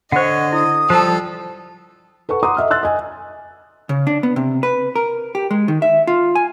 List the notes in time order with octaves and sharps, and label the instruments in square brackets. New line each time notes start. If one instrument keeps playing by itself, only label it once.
[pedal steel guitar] D3 C#5 [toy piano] C5 F#5 [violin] D#5
[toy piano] E4 [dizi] D#6
[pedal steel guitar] F3 G3 [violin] A4 [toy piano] C5 A5
[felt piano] A4 B4 F#5 C#6
F#5 A#5 C6 D6 D#6
D#5 E5 F6
C6 E6 F#6 A6
D#5 G#5
[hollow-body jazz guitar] C#3
D4
B3
C3
B4
A#4
G4
G#3
D#3
E5
F4
G#5